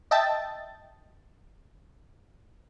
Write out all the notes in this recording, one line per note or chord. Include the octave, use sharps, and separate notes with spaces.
D#5 E5 G5 A5 A6